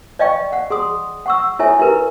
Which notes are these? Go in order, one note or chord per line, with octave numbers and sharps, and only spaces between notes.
D5 D#5 F5 G5 C#6
F#5
G#4 C6 D#6
F#5 C#6 E6
E4 A4 C#5 E5 G#5
E4 G4 A#4 B4